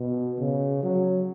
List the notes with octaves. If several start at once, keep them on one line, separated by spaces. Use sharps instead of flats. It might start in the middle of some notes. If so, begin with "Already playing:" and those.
Already playing: B2
C#3
F#3